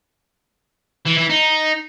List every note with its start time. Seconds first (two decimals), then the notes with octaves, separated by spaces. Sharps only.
1.06 E3
1.18 E3
1.30 D#4